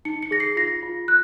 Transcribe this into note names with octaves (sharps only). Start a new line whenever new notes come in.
D#4 C#7
C#7
G#4 A#6
C7
F4 A#6
F4
F#6